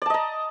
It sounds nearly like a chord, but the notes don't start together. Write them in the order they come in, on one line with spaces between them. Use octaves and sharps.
D5 A5 D#5 A#5